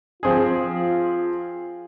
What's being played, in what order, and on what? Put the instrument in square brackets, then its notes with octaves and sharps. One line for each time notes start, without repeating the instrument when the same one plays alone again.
[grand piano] F3 C4 G#4 [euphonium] F4